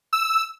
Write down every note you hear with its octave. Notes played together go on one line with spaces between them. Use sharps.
E6